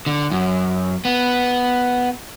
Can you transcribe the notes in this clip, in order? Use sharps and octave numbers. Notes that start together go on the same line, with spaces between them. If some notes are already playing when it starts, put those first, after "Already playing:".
D3
F#2
B3